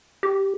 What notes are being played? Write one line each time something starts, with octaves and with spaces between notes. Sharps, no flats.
G4